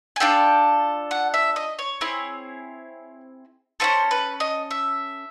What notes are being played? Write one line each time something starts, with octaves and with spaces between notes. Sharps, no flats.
G#5
D4 F4 A4 G5
F#5
E5
D#5
C#5
C4 E4 G#4
C#4 E4 A4 C5
B4
D#5
E5